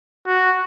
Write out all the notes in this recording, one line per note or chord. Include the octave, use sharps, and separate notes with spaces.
F#4